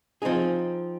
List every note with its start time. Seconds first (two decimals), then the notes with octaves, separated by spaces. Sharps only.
0.22 F3 C4 D#4 G#4